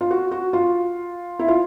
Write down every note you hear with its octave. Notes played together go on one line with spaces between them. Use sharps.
F4
F#4
F#4
F4
E4
F4